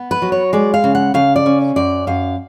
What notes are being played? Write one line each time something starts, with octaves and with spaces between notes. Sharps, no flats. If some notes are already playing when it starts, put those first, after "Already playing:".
Already playing: B3
B4
F#3
C#5
G#3 D5
F5
C#3
F#5
C#3 F5
D5
C#4
F#2 D5
F#2 F5